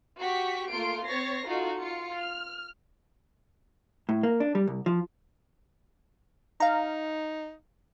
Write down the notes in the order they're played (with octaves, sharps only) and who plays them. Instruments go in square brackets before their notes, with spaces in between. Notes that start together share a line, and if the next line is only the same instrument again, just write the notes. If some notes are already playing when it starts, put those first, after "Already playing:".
[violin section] F#4 G4 C#6 B6
A3 A#3 F4 C6 D7
C4 C#5 C#6 A6 A#6 C7
D#4 F4 F#4 A4
F4 C#7
F6
[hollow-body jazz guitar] A2
A#3
D4
G3
C2
F3
[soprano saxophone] D#4 [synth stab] F5 A#5